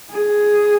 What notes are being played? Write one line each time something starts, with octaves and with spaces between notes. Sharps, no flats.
G#4